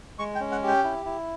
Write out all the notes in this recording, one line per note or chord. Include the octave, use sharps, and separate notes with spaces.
G#3 C#6
G5
C#4
F#5
G4
G5
E4
E4